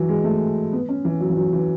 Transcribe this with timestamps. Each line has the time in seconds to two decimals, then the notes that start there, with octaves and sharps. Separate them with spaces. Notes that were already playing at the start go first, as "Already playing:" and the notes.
Already playing: E3 F#3
0.09 G#3
0.24 A3
0.73 B3
0.89 C#4
1.05 E3
1.20 F#3
1.30 E3
1.37 F#3
1.53 E3